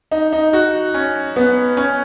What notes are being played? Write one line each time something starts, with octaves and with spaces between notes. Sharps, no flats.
D#4
D#4
F#4
C#4
B3
C#4